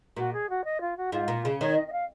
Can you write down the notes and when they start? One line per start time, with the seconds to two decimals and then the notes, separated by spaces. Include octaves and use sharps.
0.17 A#2 F#4
0.33 G#4
0.49 F#4
0.64 D#5
0.80 F4
0.97 F#4
1.12 G#2 F4
1.28 A#2
1.45 C#3
1.61 D#3 C#5
1.76 D#5
1.87 D#5
1.92 F5